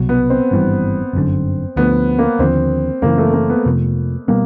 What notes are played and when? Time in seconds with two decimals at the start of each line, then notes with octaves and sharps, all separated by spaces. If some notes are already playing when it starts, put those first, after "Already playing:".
Already playing: C2 B2 F#3
0.09 B3
0.30 C4
0.51 G#1 G2 E3 G3
1.13 G1 F#2 D3
1.76 D2 D3 F3 A3 B3
2.18 A#3
2.39 D#2 D3 F3 C4
3.02 F#2 C#3 E3 A#3
3.18 A3
3.33 A#3
3.50 B3
3.65 F2 C3 F3 A3
4.28 B2 G3 A#3 B3